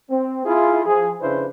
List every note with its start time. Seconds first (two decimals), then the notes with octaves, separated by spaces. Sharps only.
0.10 C4
0.45 E4 F4 G#4
0.86 F3 G#4
1.21 F2 C#3 D4 E4 B4 C5